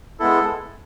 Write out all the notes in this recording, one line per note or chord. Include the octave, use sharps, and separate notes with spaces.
G#3 B3 E4 A4